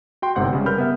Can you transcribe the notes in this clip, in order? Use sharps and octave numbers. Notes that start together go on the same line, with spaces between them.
F#4 G5 C6
G1 G#2 C3 F#5 C6 G6
C#3 G3
A#4 B4 B5 F6 G6
B3 E5